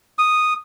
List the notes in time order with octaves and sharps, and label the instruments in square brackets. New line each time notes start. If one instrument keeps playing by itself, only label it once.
[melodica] D#6